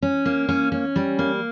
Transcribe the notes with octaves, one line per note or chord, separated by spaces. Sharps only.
C#4
A#3
C#4
C#4
G3
A#3